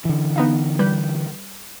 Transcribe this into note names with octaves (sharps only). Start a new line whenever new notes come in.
D3 E3
B3 D#4 F5
G3 B4 G6